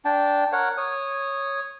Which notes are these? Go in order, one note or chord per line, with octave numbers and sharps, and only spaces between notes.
D4 G5 A5
A#4 C#5 F#5
C#5 D#6